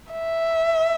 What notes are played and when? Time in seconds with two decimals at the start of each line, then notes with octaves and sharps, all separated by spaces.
0.12 E5